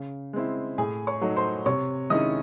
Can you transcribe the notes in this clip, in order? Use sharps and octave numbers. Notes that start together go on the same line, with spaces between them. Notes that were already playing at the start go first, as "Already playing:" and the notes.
Already playing: C#3
G#3 C4 E4
A2 G#4 G#5
C#5 C#6
F#3 A3 D#4
C5 C6
C3 C#5 C#6
D#3 G#3 C#4 E4 D#5 D#6